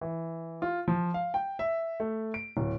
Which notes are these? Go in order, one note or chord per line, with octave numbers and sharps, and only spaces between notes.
E3
F4
F3
F5
G5
E5
A3
D7
D1